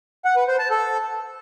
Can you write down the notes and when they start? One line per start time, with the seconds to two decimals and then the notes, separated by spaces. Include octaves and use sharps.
0.25 F#5
0.36 B4
0.48 C5
0.59 A5
0.70 A4